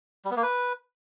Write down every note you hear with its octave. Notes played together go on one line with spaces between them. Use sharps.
G3
B3
A#3
B4